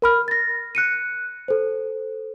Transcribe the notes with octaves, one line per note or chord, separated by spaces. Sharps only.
A#4 B5 F6
A6 A#6
F#6 C#7 D#7
A4 C5